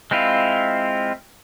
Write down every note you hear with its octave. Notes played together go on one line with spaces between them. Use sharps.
G#3 C4 E4 F4